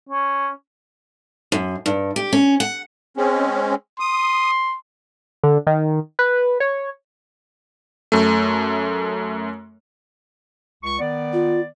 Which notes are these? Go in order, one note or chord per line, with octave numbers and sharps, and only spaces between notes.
C#4
F#2
G2
G4
C#4
F#5
G#3 C4 C#4
C6 D#6
D3
D#3
B4
C#5
F#2 A3
C#2 C#6
D#3 B3 D5
F4